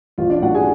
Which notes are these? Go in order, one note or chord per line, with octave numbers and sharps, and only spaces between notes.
A1 F4
D4 D5
A2 F#4 F#5
G#4 G#5